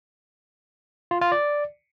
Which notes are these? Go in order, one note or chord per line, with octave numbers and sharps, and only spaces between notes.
F4
F4
D5